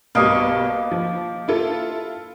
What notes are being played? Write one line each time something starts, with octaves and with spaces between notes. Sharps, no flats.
B1 G2 B2 A#3 D#5 C#6
F3
E4 F4 A4